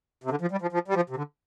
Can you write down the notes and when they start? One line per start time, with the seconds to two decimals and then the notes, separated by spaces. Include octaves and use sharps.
0.24 C3
0.31 D3
0.41 F3
0.52 G3
0.62 F3
0.72 F3
0.88 G3
0.95 F3
1.10 C3
1.16 D3